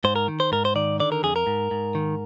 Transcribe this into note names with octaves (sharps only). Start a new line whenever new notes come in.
G#2 C5
A#4
D#3
C5
G#2 A#4
C5
D#3 D5
D3 D5
A#4
F2 G#4
A#4
G#2
G#2
D#3